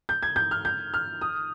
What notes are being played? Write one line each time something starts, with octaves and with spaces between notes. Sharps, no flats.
G6
G#6
G6
F6
G6
F6
D#6